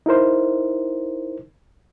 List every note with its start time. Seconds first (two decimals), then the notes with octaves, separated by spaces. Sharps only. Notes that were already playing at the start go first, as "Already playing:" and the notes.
0.06 D#4 E4 A#4 C5